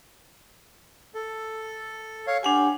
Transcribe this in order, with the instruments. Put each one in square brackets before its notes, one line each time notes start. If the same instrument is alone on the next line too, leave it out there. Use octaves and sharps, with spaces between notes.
[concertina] A4
C#5 F5
[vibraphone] D4 F#5 G#5 [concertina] G4